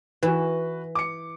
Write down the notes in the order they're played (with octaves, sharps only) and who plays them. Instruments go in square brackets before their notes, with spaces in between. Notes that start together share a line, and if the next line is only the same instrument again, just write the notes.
[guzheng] E3 [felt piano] F#4 B4
[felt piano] D6 C#7